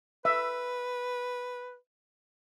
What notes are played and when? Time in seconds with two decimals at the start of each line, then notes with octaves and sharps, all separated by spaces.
0.25 B4 E5